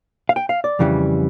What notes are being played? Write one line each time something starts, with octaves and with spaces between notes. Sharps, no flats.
F5
G5
F5
D5
F2 C#3 E3 G3